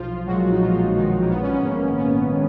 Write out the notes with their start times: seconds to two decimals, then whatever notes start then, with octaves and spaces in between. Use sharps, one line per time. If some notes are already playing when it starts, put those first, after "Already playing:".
Already playing: B1 F3 F4
0.26 A#2 F#3 G#3 F#4
0.51 D#4
0.61 B1 F3 F4
0.95 A#2 D#3 G#3 D#4
1.21 A#3
1.29 A#1 B3
1.42 C#4
1.53 B3
1.63 G#2 D#3 A#3
1.97 A#1 B3
2.32 D#3